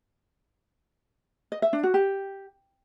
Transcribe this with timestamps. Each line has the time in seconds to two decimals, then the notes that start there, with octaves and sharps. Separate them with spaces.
1.52 D#5
1.62 E5
1.73 D4
1.83 F#4
1.94 G4